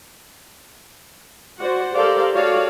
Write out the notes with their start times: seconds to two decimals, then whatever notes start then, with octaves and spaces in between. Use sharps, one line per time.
1.60 F#4 C5 D5 F#5
1.95 G4 A4 A#4 C5 D5 F5
2.33 F#4 G4 A4 C#5 D5 F5